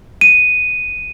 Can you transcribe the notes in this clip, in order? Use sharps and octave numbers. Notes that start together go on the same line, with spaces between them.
D#7